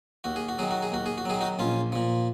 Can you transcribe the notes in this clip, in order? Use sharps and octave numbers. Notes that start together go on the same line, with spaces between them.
D#2 F#4
G#4
F#4
D#3 F#3 G#4
F#4
G#4
D#2 F#4
G#4
F#4
D#3 F#3 G#4
D#4 F#4
A#1 C#4 F4
A#2 F3